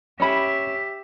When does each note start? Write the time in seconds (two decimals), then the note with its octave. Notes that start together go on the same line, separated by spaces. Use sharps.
0.20 C#4 G4 E5 B5